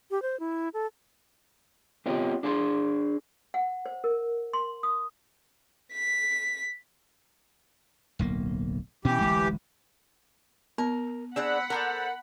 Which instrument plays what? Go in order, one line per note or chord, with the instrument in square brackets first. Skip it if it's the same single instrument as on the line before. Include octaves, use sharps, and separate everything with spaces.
[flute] G4
C5
E4
A4
[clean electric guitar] B3 C4 F4 G4 C#5 D#5
D4 G#4 A5 C6
[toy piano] F#5
C5
A#4
C6
D#6
[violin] B6
[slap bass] D1 B1 A#3
[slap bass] B2 C#4 [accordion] E3 G4
[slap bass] D1 A1 G#3
[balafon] B3 [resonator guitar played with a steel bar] A#4
[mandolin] C4 F#6 [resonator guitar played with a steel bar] D4 G#4 D5 [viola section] F#5 B5
[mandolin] A4 C5 D5 [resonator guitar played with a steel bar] A#4